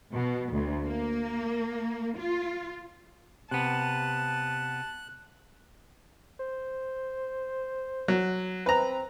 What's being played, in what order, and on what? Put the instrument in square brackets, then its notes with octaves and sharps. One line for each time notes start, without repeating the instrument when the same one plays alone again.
[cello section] B2
D2
A#3
F4
[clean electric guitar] C3 B3 [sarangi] A5 [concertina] F#6
[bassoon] C5
[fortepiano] F#3
[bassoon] C4 [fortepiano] B4 A#5